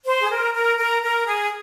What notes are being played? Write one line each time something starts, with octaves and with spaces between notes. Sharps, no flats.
C5
G#4
A#4
A#4
A#4
A#4
G#4